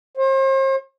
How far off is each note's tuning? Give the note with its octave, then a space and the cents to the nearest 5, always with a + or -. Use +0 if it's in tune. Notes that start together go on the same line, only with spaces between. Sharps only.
C5 +40